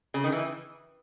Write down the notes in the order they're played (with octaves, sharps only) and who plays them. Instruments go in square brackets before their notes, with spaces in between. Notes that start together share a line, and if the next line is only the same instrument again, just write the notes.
[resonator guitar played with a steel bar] C#3
D#3
E3